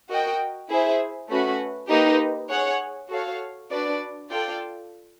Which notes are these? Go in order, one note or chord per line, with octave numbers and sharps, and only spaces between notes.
F#4 A#4 D#5 G5
E4 G#4 C5 E5
A3 C#4 F#4 B4
A#3 D#4 G4 B4
G#4 C#5 F#5
F#4 A4 C#5 F5
D4 F#4 B4 D5
F4 A4 D5 G5